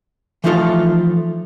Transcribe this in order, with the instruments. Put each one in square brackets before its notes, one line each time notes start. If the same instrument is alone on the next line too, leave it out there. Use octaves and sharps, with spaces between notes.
[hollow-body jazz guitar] E3 F3 A3 D#4 F4 A4